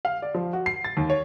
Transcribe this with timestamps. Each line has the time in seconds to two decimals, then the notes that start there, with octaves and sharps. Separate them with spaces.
0.05 F5
0.22 D5
0.35 F3
0.53 F#4
0.66 C7
0.85 A6
0.97 D#2
1.10 C#5